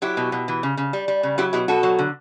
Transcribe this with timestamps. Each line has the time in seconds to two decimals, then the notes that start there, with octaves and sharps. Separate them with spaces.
0.02 F#3 E4 G4
0.17 B2
0.32 B2
0.48 E3
0.63 C#3
0.77 C#3
0.93 G3
1.08 G3
1.23 C#3
1.38 F#3 E4 G4
1.53 B2 E4 G4
1.68 B2 F#4 A4
1.83 F#3
1.99 D3